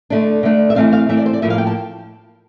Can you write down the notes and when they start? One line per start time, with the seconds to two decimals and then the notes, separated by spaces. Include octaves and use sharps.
0.10 D3 A3 D4
0.43 D3 A3 D4
0.70 E5
0.76 E3 A3 C4 F5
0.93 F5
1.09 E3 A3 C4 E5
1.17 D5
1.26 C5
1.33 D5
1.42 A2 F3 A#3 E5
1.50 F5
1.58 G5
1.67 A5